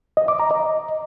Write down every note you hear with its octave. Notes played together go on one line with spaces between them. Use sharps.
D#5
D6
A#5
D#5